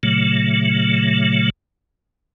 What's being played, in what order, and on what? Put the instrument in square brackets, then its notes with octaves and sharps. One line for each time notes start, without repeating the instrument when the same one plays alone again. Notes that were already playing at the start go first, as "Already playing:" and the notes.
[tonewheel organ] A#2 C#3 F#3 A3